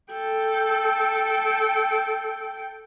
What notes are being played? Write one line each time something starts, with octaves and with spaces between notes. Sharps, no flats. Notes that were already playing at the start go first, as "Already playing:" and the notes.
A4 G5